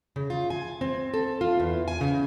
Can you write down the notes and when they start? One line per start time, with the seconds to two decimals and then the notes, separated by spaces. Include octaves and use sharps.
0.16 C#3
0.30 F4
0.50 G#5
0.81 C4
1.14 A4
1.41 F4
1.60 E2
1.88 G#5
2.01 C#3